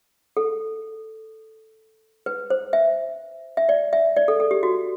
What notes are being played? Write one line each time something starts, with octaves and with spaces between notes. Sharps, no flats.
A4
B4
C5
E5
E5
D5
E5
D5
A4
A4
G4
F#4